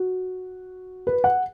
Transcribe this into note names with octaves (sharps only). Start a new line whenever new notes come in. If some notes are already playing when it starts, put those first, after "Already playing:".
Already playing: F#4
B4
F#5